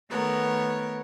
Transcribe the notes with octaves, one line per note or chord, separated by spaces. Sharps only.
D#3 A3 B3 A#4 C#5